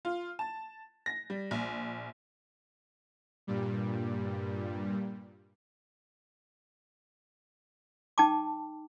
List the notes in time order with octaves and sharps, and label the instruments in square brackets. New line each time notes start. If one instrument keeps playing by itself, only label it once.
[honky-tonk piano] F4
A5
A#6
G3
A#1
[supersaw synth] G2 A#2 G3
[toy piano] D#4 G5 A5 D6